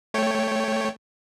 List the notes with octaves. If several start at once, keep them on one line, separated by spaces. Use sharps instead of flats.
A3 C#5 G5